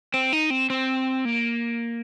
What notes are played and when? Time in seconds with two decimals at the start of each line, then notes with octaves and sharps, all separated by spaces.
0.14 C4
0.33 D#4
0.50 C4
0.70 C4
1.25 A#3